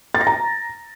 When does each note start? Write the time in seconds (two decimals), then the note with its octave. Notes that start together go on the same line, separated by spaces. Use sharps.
0.15 A6
0.21 A#6
0.27 A#5